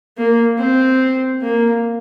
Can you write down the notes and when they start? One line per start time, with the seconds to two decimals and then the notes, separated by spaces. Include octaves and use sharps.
0.17 A#3
0.58 C4
1.41 A#3